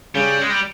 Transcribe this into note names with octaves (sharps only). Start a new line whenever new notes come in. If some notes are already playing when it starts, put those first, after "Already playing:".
C#3 G3
G#3
G3